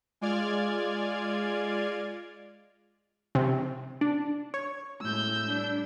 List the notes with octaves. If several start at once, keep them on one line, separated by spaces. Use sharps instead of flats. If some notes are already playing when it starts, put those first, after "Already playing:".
G#3 F4 D5 F6 G#6
C3
D4
C#5
A2 G#3 E6 G6
G3 D4